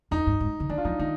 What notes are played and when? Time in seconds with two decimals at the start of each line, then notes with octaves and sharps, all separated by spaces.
0.11 F2 D#4
0.27 G2
0.40 G#2
0.60 D3
0.69 D#3 D4
0.78 F4
0.85 F3 D#4
0.99 D#3 D#4